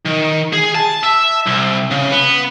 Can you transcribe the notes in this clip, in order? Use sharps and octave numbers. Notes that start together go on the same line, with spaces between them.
D#3
G#4
A5
E5
C2
C#3
B3